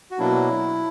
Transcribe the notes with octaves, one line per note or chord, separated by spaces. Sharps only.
F#4
B2 F#3 A#3 D4 E4